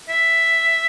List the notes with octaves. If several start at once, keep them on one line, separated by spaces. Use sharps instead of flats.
E5